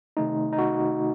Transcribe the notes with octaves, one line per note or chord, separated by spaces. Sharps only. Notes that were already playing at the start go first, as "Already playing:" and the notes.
C3 D#3 A3 D#4
D#4
F#4